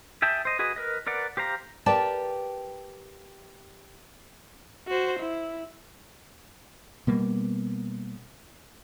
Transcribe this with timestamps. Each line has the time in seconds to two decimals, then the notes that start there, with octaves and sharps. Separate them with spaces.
0.22 G#4 E5 G5 A5
0.45 C5 D#5
0.59 F#4 G#4 B4 D#5
0.76 A#4 B4 D#5
1.07 A#4 B4 D5 F#5
1.37 G4 C5 F5 A#5
1.86 G4 A#4 B4 D5 G5 A5
4.88 F#4 C5
5.19 E4
7.07 B2 G3 A#3 B3